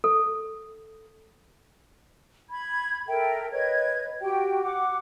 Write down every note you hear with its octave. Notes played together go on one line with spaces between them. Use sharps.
A4
B5 G#6
A4 A#4 E5 G5
B4 C#5 D#5 G#6
F#4 G4 G5
F#5 D6